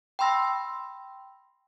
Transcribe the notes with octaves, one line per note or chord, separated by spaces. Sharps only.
G5 B5 C6 E6 A#6